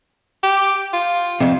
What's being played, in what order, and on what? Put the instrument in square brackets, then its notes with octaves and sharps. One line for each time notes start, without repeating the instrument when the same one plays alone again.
[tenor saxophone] G4
F4
[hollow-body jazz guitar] F2 C3